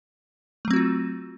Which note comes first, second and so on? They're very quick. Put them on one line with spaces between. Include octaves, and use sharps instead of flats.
A3 F#3 C4 F#4 F4